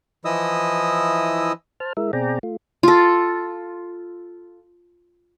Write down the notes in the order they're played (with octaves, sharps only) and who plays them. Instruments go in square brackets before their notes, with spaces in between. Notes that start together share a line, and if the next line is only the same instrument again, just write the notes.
[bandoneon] E3 F3 E4 D#5 D#6 E6
[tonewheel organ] C5 A5 F6
G#3 E4 A#4 E5
B2 C4 G#4 D5 G5 A#5
A3 F4
[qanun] F4 A4